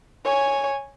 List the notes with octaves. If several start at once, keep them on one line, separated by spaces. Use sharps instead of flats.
C#5 G#5